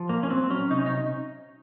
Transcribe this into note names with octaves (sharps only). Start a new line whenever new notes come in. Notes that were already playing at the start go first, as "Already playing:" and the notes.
Already playing: F3
A#2 A#3
C#4
F#3 C4
F#3 C#4
C3 D#4
C#4
D#4